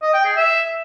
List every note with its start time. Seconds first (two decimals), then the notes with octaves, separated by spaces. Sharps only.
0.02 D#5
0.13 G5
0.25 G#4
0.36 E5